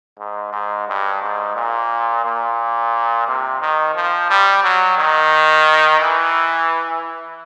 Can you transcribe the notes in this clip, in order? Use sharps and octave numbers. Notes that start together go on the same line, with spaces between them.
G#2
G#2
G2
G#2
A#2
A#2
C3
D#3
F3
G3
F#3
D#3
E3